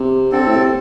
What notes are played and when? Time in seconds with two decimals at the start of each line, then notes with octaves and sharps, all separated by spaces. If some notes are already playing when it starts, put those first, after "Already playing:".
Already playing: C3
0.32 D3 C4 A4
0.39 C3
0.47 A2
0.56 C3